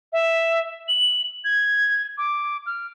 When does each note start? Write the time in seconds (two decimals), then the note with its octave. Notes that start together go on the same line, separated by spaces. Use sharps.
0.13 E5
0.88 F#7
1.44 G#6
2.18 D6
2.66 F6